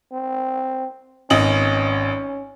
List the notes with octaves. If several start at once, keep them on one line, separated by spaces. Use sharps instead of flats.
C4
G#1 C#4 D#5 F#7